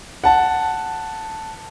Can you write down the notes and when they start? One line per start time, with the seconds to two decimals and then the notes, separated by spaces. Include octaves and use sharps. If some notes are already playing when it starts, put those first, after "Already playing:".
0.24 F#5 A5